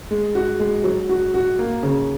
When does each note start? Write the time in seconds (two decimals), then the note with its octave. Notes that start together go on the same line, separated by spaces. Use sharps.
0.11 G#3
0.35 F#4
0.59 G#3
0.84 F#3
1.09 F#4
1.34 F#4
1.59 A#3
1.83 C#3